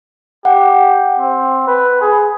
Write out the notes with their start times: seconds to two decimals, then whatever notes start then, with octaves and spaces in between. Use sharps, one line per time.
0.45 G4 F#5
1.19 C4
1.67 B4
2.01 G#4